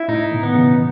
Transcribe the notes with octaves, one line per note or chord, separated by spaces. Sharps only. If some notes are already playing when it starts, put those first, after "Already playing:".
Already playing: E4
A2 D#4
B2 D#3
B3
C#3 E3